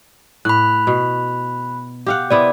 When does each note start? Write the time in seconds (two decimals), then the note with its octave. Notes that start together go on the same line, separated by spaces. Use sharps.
0.45 A2 B5 F#6
0.87 B2
2.06 G4 F5 F#5
2.31 C3 B3 E4 D5